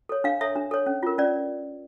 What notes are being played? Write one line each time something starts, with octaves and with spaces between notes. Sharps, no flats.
A4 C#5
D4 F5
A4 C#5 E5
D4
A4 C#5
C#4
F4 A#4
C#4 D5